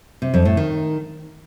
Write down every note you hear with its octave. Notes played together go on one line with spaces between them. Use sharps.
C3
F2
A2
D#3